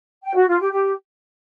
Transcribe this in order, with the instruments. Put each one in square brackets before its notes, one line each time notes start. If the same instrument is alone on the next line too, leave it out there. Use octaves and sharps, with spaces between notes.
[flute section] G5
F#4
F4
G4
G4